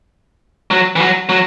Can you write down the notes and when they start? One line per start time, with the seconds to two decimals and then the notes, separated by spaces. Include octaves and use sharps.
0.71 F#3
0.96 E3
1.00 F#3
1.29 F#3